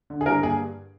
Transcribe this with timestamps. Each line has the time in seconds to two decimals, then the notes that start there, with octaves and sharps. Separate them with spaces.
0.10 D3
0.21 G#4
0.26 G2 A#4
0.43 A#3 G#4